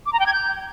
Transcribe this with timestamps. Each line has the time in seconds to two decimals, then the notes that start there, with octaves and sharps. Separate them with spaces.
0.06 D6
0.13 A#5
0.20 G5
0.26 G#6
0.33 G6